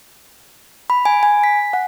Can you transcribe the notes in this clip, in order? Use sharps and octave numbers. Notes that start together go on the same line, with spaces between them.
B5
G#5
G#5
B6
F#5